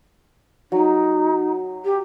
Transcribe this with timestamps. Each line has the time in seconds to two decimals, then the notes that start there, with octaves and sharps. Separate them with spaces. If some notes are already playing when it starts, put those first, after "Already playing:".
0.72 F#3 D#4
1.85 G4